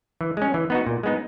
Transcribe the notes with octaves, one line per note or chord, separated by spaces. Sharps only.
E3
G#3 C#4
E3
B3 D#4 F#4
A#2
G#3 B3 D#4